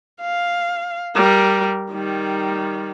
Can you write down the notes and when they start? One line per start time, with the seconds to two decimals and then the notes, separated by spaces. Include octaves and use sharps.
0.22 F5
1.16 G3 A#4
1.92 D#3 G3